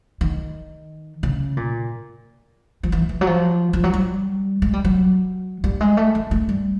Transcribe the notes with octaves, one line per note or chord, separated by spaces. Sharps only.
D#3
C#3
A#2
F3
E3
E3
F#3
F3
F3
F#3
G3
G#3
G3
F#3
G3
G#3
A3
A3
A3
G3